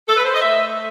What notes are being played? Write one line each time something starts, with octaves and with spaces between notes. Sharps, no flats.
A4
B4
C5
D#5
A3 E5